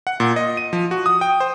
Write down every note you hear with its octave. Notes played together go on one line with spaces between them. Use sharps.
F#5
A#2
D#5
D#7
F3
F#4
D#6
G5
C5